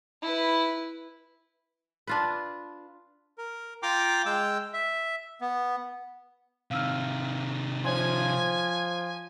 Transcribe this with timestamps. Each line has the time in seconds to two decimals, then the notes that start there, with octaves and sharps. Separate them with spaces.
0.22 E4 B4
2.07 D4 F4 B4
3.38 A#4
3.83 F4 G5 A#5 C6 D6
4.26 G#3 G5 E6
4.74 E5
5.41 B3
6.71 C3 D#3 F5 E6 F6
7.84 F3 C5 C#5 G#5 C6